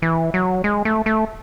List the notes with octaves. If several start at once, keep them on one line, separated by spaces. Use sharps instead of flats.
E3
F#3
G#3
A3
A3